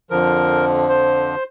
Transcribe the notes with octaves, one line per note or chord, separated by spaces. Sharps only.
F2 D3 F3 A#4
C5